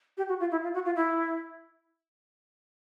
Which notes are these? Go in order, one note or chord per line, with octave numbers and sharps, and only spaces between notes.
G4
F#4
F4
E4
F4
F#4
F4
E4